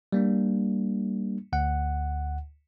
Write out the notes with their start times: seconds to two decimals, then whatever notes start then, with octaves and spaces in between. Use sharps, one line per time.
0.13 G3 A#3 D4
1.53 D2 F#5